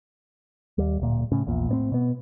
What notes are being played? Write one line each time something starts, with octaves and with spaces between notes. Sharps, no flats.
D#2 G3
D1 A#2
A2 C#3 C#4
A#1 E2 A#2
A2 B3 C4
B2 B3